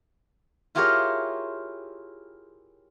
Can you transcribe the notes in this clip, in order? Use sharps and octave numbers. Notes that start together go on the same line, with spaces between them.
E4 F4 G4 G#4 A#4 C#5